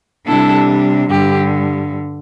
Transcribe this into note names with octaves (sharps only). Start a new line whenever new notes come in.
C3 G3 D4 E4 A4
G2 D3 G3 G4